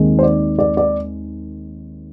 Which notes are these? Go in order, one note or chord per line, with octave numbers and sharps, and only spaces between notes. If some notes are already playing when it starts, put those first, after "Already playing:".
Already playing: D#2 D#3 G#3 C4
C5
D5
D5
D5